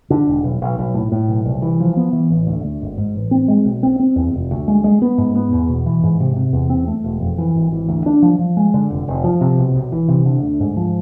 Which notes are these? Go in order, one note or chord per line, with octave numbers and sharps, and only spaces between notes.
D3
E1
B1
B1
B1
A2
A2
B1
C2
E3
F3
B3
E3
A1
D2
D2
G#1
G#2
A1
C4
G#3
B1
C4
C4
E2
F1
D2
G#3
G#3
B3
G#2
B3
E2
B2
E3
G#2
C3
C3
E2
C4
A3
E1
F2
E3
G#1
E3
D2
D4
F3
F3
G#3
D3
F1
F1
F3
C3
B1
B1
E3
C3
D3
D2
G#2
F3